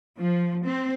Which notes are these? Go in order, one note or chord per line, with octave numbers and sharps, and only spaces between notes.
F3
C4